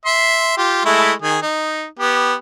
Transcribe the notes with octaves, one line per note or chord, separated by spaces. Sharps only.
E5 C6
F4 G4
G#3 A3 E4
D#3 G#4
D#4
B3 G4